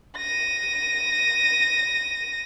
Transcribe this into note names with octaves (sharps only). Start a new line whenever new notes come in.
A#6 D#7